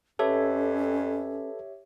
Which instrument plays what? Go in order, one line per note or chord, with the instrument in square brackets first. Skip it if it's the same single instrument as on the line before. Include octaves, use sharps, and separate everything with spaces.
[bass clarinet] F2 [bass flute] C#4 [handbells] G4 C#5 E5 [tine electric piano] A4 B4